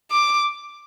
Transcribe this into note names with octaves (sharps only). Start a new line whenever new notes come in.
D6